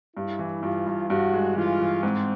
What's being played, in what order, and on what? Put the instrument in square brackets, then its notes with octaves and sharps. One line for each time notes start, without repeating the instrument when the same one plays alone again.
[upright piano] G2 [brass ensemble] E4
[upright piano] E3
[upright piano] G2 [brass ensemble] F4
[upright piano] G2
[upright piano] G2 [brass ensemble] F#4
[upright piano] G#3
[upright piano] E3 [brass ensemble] F4
[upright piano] E3
[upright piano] G#2 [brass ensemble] C4